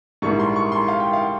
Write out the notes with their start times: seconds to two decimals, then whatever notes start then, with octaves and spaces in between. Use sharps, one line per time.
0.22 A#1 G#2 E3 G3 A#3 C#6
0.39 C6
0.56 C#6
0.72 C6
0.88 F5
1.00 G5
1.13 F5